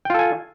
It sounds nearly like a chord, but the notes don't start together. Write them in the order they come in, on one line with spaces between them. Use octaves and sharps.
G5 F4 A4 G#5